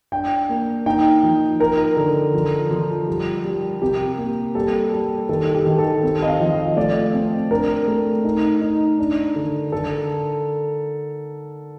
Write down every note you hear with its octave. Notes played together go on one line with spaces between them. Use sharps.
D4 G5
A#3
D#4 G5
F3
D#4 A#4
D3
F3
F3
G3
G3
C3 G4
A#3
G3 A4
G3
D#3 A4
G4
D#3
A4
C4
D#5
F5
F3
D#5
A3 D5
C4
D4 A#4
A3
D#4
D#4
D4
D3
D3 A4